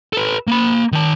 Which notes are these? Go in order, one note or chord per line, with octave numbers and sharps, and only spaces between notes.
A4 B4
A#3 B5
D#3 A5